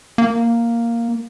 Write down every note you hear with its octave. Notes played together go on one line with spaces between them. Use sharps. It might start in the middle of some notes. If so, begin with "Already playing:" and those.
A#3